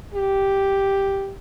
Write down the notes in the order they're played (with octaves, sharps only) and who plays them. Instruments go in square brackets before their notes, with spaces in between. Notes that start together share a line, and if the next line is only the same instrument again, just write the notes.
[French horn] G4